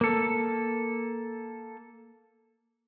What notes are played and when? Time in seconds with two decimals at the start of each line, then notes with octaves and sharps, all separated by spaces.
0.01 A#3 A4